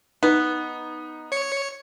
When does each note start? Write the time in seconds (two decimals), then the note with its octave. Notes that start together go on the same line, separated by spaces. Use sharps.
0.23 B3 D#4
1.32 C#5 C#7